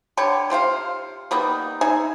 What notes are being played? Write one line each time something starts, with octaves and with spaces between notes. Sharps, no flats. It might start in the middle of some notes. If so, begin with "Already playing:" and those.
D3 G3 G4 C#5
C3 F4 C5 F5
G3 A#3 B3 D#4
D#4 G#4 E5 G#5